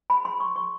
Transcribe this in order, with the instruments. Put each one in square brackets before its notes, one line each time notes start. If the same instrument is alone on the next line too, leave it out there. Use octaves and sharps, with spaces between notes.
[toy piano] B5
C6
C#6
C#6